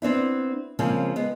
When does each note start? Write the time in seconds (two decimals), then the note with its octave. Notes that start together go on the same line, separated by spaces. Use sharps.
0.02 B3 C4 D4 E4
0.79 C#3 F3 G#3 A#3 C4 C#4
1.16 G#3 B3